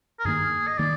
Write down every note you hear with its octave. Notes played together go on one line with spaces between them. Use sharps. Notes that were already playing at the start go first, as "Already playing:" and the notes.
A#4
G2 D#3 A#3 G#4
D#5
D#3 A#3 D5